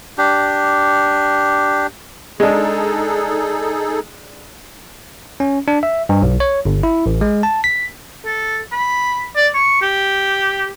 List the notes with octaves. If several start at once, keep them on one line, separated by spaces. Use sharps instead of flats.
D4 G4
G#3 D4 D#4 G#4 A4
C#4
D4
E5
G2
B1
C#5
G1
E4
A1
G#3
A5
B6
A4
B5
D5
C#6
G4